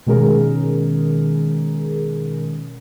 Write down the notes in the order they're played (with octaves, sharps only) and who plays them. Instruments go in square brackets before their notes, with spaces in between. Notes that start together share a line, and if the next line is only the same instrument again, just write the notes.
[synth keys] B2 D#3 G#3 C#4 G#4 A#4